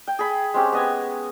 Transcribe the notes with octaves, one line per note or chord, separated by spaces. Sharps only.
G5
G#4 B5
G#3 C4 C#4 G4
B3 D#5 G#5